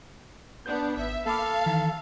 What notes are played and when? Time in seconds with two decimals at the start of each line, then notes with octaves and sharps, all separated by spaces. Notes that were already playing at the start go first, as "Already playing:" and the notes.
0.66 B3 D4 G6
0.97 G#1 E5
1.26 A#3 A4 F5 B5 D6
1.66 D#3 E3